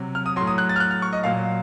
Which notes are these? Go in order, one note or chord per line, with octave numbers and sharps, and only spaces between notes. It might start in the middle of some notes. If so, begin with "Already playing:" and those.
Already playing: C3 F#3
F6
D#6
A2 F#3 C6
D#6
F#6
A6
F6
F#6
F6
C#6
D#5
A#2 F#3 F5